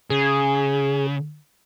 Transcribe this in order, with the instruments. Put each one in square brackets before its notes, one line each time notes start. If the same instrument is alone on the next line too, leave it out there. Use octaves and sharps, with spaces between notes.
[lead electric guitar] C#3 [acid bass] G#4